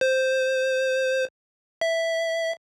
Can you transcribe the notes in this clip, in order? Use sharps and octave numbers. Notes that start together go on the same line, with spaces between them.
C5
E5